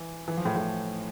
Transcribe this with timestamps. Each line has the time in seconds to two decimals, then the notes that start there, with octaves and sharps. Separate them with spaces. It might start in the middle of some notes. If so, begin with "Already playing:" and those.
Already playing: E3
0.28 E3
0.37 F3
0.45 A2
0.56 A2